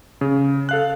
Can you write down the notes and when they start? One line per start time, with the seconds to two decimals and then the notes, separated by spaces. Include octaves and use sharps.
0.21 C#3
0.69 A4 F5 F#6